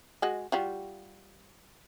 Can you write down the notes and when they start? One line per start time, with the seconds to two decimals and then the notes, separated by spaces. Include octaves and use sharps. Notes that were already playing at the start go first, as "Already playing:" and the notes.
0.22 G#3 F#4 D#5
0.52 G3 F4 F#4